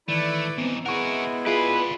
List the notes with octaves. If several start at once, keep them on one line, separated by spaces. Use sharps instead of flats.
D#3 E3 A3 E4 B4 D5
G2 E3 B3 C4 D#4
G#3 B3 E4 F#4 A#4 F#5 C#6
F4 G#4 B4 D5 E5 F5